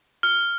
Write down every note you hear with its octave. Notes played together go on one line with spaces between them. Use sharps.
F6